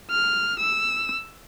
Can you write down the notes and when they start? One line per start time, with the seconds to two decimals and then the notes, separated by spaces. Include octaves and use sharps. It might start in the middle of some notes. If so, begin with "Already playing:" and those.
0.11 F6
0.59 E6